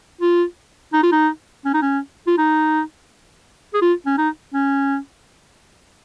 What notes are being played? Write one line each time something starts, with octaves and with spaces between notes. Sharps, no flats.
F4
D#4
F4
D#4
C#4
D#4
C#4
F4
D#4
G#4
F4
C#4
D#4
C#4